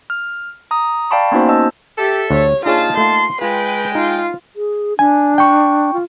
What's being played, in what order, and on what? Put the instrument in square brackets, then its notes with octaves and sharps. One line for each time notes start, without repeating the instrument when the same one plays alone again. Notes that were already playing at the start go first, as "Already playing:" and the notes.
[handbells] F6
A#5 D#6
D5 F5 G5 A5 B5 C#6
A#3 B3 C#4 D#4 F#4 C5
C#4 D#5 A5 E6
[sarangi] G4 [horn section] A4 E5
[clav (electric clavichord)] D2 [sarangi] C#5
[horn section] A#2 D#4 A5 [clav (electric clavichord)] D4 G#4 C#5 [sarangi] F4
[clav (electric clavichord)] A3 F4 [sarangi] C6
[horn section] G#3 G5 [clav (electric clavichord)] F4 [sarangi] B4
[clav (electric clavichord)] D#4 [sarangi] F4
[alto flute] G#4
[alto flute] D4 [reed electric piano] G#5
[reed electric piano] G5 C#6
[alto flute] F4